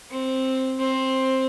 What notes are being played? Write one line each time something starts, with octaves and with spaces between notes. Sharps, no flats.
C4
C4